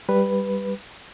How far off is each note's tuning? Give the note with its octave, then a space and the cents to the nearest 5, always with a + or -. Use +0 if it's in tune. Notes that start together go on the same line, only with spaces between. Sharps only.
G3 +0 B4 +0